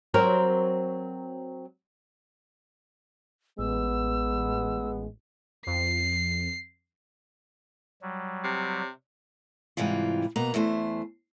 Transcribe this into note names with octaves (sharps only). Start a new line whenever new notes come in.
F#3 C4 A#4
A1 G#3 B3 E6
F2 C7
F#3 G3
C3
G#2 C3 E3 G3 F4
B2 A#3 B4 A#5
E2 E3 A3 C5